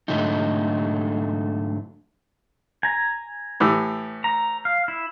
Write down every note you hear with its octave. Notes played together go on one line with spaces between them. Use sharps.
G#2 D3 F#3 A3 D#4
G#5 A#5
A2 E3 G4
A#5
F5
E4